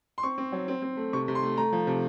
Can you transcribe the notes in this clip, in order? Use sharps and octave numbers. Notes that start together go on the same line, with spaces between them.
C6
C4 C#6
C4
F#3
C4
C4
A3
C3 C#6
C3
C6
A3
A3 A#5
F3
C3